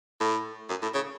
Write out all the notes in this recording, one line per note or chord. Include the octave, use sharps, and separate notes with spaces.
A2
F#2
A2
C#3